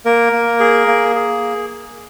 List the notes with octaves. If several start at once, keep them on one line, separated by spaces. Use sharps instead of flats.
A#3 A#4
A#3
G#4
A#3
G#4